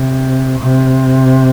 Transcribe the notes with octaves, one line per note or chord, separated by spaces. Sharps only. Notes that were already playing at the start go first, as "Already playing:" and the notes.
Already playing: C3
C3